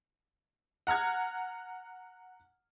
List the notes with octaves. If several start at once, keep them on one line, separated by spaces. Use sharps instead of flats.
F#5 A#5 F6 G#6